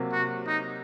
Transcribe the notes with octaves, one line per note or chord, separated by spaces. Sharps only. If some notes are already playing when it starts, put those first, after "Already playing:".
Already playing: C3 F#3 A#3
F#4
D#4